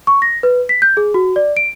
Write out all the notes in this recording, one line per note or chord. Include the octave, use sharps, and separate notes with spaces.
C#6
A#6
B4
B6
G6
G#4
F#4
D5
D7